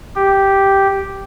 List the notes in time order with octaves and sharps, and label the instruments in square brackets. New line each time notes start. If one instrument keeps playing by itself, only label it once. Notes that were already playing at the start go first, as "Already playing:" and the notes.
[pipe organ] G4